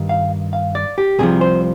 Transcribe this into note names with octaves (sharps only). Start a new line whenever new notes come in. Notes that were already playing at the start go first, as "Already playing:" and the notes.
Already playing: G2 D#3
F5
F5
D5
G4
C2 C3 F3 G#4
C5